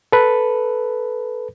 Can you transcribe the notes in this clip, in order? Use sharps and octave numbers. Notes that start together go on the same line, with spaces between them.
A4 B4